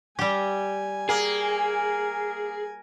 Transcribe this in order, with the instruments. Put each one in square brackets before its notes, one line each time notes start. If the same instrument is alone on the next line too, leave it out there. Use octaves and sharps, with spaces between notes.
[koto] G3 G4 [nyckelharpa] G#5
[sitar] A#3 [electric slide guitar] G#4